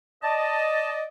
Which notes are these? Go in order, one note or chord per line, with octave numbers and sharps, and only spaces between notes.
D5 D#5 A5